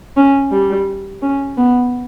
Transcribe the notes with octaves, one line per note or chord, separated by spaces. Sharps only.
C#4
G3
C#4
B3